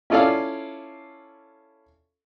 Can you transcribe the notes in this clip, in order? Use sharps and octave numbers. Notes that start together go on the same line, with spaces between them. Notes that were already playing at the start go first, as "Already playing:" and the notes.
C#4 E4 F4 A4 D5 F5